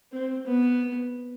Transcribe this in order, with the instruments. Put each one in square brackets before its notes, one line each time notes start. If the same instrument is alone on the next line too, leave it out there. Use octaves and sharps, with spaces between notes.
[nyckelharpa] C4
B3